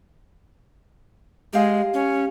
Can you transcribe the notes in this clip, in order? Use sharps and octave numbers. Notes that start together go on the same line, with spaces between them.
G#3 G4 F5
C#4